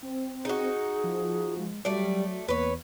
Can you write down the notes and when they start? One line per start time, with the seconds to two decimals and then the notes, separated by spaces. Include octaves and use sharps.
0.03 C4
0.45 D#4 F#4 G#4
1.04 F3
1.58 G#3
1.85 F#3 G3 A3 D5
2.48 E2 A#3 B4 C#5